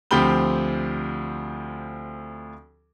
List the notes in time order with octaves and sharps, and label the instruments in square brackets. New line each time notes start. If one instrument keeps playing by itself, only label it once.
[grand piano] D2 F3 C4 G4 B5 G7